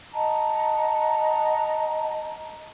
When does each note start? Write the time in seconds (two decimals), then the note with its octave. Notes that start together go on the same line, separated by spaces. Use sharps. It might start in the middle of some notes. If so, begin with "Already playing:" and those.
0.13 D#5 F#5 A5 A#5